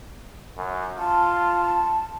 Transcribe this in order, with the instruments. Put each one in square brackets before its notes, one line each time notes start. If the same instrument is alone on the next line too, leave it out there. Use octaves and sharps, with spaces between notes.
[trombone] F#2
[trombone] F4 [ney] A5